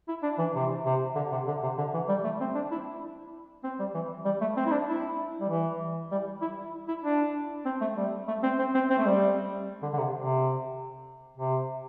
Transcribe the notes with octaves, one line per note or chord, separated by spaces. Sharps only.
E4
D4
E3
C3
C3
D3
C3
D3
C3
D3
E3
G3
A3
C4
D4
E4
C4
G3
E3
G3
A3
C4
E4
D4
E4
G3
E3
G3
E4
E4
D4
C4
A3
G3
A3
C4
C4
C4
C4
A3
G3
D3
D3
C3
C3
C3